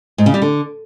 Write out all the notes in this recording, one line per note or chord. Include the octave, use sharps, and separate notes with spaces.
G#2
C#3
G3
D3